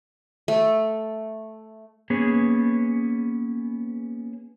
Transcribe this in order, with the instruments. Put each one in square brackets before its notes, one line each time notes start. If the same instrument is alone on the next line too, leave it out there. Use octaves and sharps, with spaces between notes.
[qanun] A3
[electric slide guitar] A#3 B3 C#4 G#4